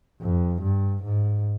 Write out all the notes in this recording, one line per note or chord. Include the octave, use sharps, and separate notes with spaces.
F2
G2
G#2